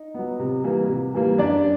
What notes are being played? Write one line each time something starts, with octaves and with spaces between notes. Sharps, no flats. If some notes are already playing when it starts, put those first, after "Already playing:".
Already playing: D#4
F#3 B3
C3
E3 G3 A#3
C3
E3 G3 A#3
F#2 D4 D5